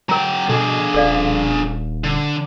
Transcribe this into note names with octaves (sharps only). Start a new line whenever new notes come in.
F#3 A#4 G5 A#5
B2 D4 G#4 A4
D#1 A4 D5 F5
D3